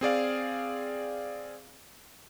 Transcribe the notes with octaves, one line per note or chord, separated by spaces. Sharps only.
C4 G#4 D5 F5